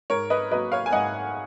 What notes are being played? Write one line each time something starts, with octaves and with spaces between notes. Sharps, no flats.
G#2 A#4 C#5
B4 D#5
F#3 A#3 B4 D#5
C#5 F5
G#5
G#2 D#5 F#5